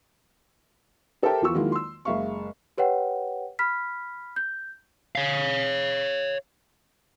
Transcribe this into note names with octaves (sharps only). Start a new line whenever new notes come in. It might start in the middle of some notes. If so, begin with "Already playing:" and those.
G4 A4 A#4 C5 E5 G5
E2 E3 F3 F4 C#6 E6
D#3 F#3 G#3 A#3 E4 F4
C6 E6
F#1 G#3 E5 F5 C#6
G4 B4 C#5 F#5 G5
B5 F6 B6
G6
C#5 F5